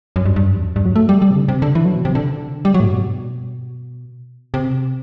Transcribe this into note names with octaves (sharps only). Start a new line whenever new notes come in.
F#2
G2
G2
F#2
E2
F#2
G2
F#3
A3
G3
G3
C3
D3
C3
D3
E3
F#3
B2
C3
D3
G3
F#3
A2
G2
B2
C3